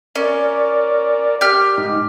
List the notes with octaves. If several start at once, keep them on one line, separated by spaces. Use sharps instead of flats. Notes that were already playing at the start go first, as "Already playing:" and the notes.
C#4 A#4 D5
G4 F6
G#2 D#4